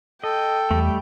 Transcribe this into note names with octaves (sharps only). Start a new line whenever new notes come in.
A4 D#5 G5
E2 G3 A3